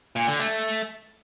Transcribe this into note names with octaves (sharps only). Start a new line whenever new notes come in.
A#2
D3
A3